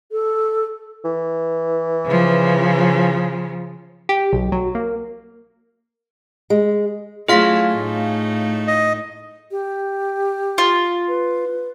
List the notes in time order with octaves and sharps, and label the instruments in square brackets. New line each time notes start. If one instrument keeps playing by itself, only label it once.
[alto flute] A4
[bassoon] E3
[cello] C#3 F3
[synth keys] G4
B1
F#3
A#3
[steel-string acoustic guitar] G#3
[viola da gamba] F#3 A3 E4 [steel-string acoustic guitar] C#4 F4 [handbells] G#4 F5 B6
[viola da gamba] A2 A3 D#4
[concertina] D#5
[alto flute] G4
[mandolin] F4
[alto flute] B4